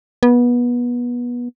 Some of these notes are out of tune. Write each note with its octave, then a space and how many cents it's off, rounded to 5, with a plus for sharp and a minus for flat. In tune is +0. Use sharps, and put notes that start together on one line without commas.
B3 -25